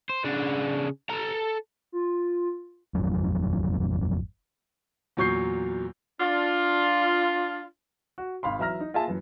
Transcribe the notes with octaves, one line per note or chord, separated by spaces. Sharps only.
C5
C#3 D4
A4 A#5
F4
D#1 G#1 F2 F#3
E2 A#2 F#3 C#6 G6 C7
D4 F4
F#4
G#1 F5 B5 C6
E3 F#3 E5 A#5 F6 A#6
D#4
A#3 F4 G#4 E5 G#5 A5
F#2 E3